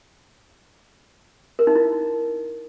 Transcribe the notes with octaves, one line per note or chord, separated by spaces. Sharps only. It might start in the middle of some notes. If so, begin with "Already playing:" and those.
A#4
D#4
E4